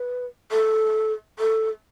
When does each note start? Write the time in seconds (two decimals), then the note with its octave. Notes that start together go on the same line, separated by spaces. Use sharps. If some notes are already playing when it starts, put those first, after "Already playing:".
Already playing: B4
0.51 A4
1.39 A4